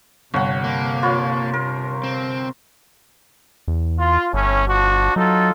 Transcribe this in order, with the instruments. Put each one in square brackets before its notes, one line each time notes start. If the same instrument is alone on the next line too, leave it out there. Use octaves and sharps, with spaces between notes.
[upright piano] G1 [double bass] C3 [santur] C#5 F#5
[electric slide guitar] A#3
[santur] F4 B4 C#5
A#4
[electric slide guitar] C4
[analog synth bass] E2
[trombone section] F4
[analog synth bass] G1 [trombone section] A2 C#4
[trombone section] F3 D4 F#4
[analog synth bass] F#3 [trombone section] D#4 F4 A4